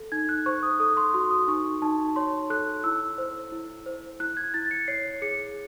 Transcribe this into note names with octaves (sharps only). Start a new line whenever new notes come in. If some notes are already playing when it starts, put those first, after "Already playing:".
Already playing: A4
D#4 G#6
F#6
C5 C#6
D#6
A4 D#6
C6
F#4 C6
D#6
D#4 C#6
D#4 A5
C#5 C6
A4 F#6
E4 E6
C5
E4
C5
E4 F#6
G#6
E4 A6
C#7
C#5 C7
G#4 C#7